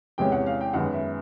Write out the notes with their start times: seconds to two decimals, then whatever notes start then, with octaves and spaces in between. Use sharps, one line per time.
0.18 E2 C3 E3 G#3 C#4 G5
0.32 F#5
0.46 F5
0.61 G5
0.74 F#2 D#3 G#3 B3 F#5
0.93 E5